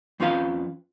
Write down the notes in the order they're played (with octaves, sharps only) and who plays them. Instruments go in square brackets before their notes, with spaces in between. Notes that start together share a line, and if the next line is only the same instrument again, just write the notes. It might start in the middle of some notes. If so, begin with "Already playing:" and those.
[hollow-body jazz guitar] F2 C4 C#4 F4 B4 F5